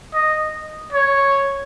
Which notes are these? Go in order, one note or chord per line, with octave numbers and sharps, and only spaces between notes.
D#5
C#5